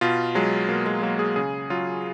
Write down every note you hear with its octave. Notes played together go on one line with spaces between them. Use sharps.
B2 F4
F#3 G#3
B2 A#3
G#3
F#3 A#3
G#4
C#3 G#4
F#3 F4